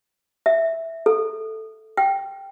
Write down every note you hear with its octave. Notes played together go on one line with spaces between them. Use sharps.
E5
A4
G5